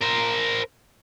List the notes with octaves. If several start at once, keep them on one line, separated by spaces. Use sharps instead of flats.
A#4 C5